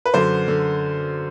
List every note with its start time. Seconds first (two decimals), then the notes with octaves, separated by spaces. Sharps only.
0.06 B4
0.14 F#2 D3 C5
0.48 D3